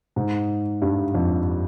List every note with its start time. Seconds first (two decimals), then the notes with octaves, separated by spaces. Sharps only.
0.16 G#2
0.82 G2
1.14 F2